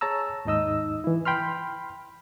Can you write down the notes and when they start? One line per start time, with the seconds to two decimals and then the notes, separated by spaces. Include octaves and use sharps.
0.01 G#4 C#5 A5 A#5 E6
0.45 D#2 G#2 D#4 D#5 E6
1.04 E3 E4
1.25 G5 B5 C6 F6